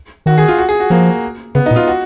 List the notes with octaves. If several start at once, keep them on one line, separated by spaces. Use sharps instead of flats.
D#3 F#4
G#4
F4
F#4
G#4
F#4
F3 A#3
C#3 B3
D#4
A#2
F4
F#4